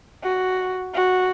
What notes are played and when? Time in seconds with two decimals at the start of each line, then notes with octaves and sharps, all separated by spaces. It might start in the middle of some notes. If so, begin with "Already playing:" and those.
0.23 F#4
0.94 F#4